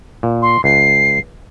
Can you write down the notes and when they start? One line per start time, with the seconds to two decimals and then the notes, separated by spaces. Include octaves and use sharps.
0.23 A#2
0.42 C6
0.64 C#2 C7